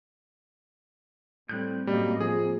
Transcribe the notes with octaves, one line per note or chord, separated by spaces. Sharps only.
A2 G3 C4 F#6 G6
F#2 A2 G3 A#3 D#5
F3 A#3 G#4